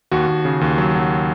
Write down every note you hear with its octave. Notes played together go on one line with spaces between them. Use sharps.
D#2 F#4
D#2
C#3
D#2
F#3
F#3